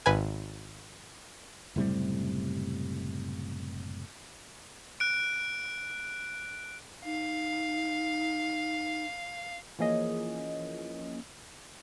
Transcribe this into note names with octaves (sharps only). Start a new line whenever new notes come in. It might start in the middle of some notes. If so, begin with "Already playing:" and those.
G#1 B4 G#5
F#1 A2 C3 G3
F#6 D7
D#4 F5
E3 F3 A#3 C#4 G#4 D#5